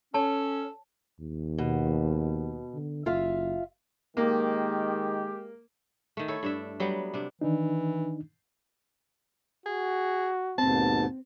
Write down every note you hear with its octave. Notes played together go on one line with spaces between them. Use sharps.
C#4 A4 C#5 A5
D#2
B2
D3
F#1 F4 E5 F5
D#3 G#3 A#3 G4
D#3 A3
E4 A4 C#5
G2 D4 E5
F#3 G3 B3
C3 D4
D#3 E3 D4 D#4
F#4 G#4
D#2 G#2 B2 C4 A5